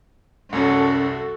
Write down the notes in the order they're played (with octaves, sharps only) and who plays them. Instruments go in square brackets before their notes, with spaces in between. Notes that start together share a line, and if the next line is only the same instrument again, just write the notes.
[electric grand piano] C2 F#2 [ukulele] C#4 F#5 [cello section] F#4 A4